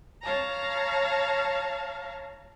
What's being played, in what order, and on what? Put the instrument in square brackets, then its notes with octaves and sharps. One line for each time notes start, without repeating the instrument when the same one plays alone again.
[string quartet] C#5 F5 A5 A#5